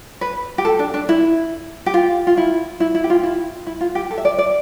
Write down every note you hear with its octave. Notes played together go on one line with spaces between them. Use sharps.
B4
G4
A4
D4
D4
E4
G4
F4
F4
E4
E4
E4
G4
F4
E4
E4
F4
G4
A4
E5
D5
D5